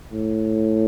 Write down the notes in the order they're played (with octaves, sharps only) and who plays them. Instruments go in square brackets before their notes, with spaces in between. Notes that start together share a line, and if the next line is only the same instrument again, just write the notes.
[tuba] A2